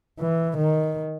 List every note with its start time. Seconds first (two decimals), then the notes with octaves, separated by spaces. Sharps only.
0.19 E3
0.57 D#3